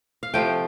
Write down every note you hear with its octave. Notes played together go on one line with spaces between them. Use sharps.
F5
C3 F3 A3 G5